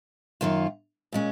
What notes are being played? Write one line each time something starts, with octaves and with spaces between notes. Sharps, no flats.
F#2 D#3 A#3 F4
A#2 G#3 C#4